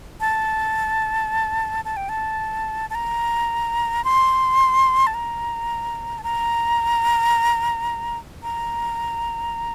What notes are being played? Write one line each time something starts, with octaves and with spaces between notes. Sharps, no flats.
A5
A5
G5
A5
A5
A#5
C6
A5
A#5
A5
A#5
A#5